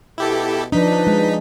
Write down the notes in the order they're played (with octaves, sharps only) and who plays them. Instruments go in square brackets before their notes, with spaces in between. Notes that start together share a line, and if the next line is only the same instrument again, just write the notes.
[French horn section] B2 [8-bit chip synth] E4 G4 A4
[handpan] F3 D4 [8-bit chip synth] D#4 B6 [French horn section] B4
[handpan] G#3